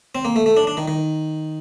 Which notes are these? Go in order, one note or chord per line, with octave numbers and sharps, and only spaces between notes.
C4
A#3
A3
A3
D4
D4
D#3
D#3